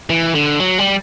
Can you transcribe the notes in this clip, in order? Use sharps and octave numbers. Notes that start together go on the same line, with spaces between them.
E3
D3
F#3
G3